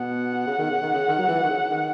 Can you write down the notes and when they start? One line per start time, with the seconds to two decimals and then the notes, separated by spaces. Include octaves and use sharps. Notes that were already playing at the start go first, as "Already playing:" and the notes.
Already playing: B2 F#5
0.47 C#3
0.58 D#3
0.70 C#3
0.82 D#3
0.93 C#3
1.08 D#3
1.18 F#3
1.28 E3
1.43 D#3
1.49 C#3
1.70 D#3